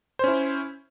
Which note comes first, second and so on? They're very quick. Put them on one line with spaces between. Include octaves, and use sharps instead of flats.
C5 C#4 E4